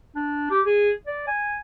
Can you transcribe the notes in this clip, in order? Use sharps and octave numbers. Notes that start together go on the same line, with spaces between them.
D4
G4
G#4
D5
G#5